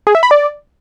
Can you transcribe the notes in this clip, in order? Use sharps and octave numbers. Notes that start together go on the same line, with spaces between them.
G#4
E5
B5
D5